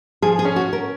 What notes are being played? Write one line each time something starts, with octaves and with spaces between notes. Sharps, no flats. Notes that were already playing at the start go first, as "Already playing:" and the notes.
F3 G#4
G#4
C#4
F#4
C#4 A#4